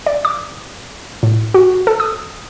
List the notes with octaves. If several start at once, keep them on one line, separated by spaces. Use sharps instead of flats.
D5
D6
A2
F#4
A4
D#6